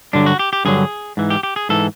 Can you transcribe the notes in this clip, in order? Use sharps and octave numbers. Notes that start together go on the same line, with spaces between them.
G2 D3 F#3 D4
F#4
G4
G4
G2 D3 F#3 G#4
G#2 E3
G4
G4
G#4
G#2 E3 A4